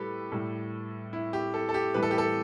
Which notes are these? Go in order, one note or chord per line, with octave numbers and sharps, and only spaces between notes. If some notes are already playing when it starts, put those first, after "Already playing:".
Already playing: A2 G3 G4 A4 B4
A2 G3
E4
G4
A4
A4
G4
A2 E3 G3 B4
A4
G4
A4